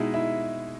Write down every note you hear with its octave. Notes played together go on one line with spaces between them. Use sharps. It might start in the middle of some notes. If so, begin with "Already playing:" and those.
Already playing: B2 G#3 D#4 E4 E5
E4 E5